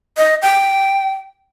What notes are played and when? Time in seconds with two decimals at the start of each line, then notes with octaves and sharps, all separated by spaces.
0.17 D#5
0.42 G5